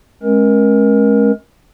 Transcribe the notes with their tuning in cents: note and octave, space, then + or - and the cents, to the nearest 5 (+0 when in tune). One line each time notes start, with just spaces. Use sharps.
G#3 +30 C#4 -30 A#4 +25